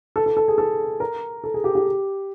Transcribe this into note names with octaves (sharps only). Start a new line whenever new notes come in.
A4
A4
A4
G#4
A4
A#4
A4
G#4
G4
G4